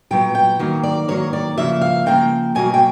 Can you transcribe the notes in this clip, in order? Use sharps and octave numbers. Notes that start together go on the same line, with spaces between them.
A#2 F#3 B3 G5
G5
D#3 F#3 A#3
D5
D#3 F#3 A#3 C#5
D5
C#3 F3 A#3 E5
F5
C#3 F3 A#3 G5
B2 F#3 A#3 G#5
G5